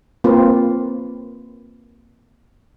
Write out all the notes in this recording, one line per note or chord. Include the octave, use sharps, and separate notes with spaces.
A#3 C4 F4 B4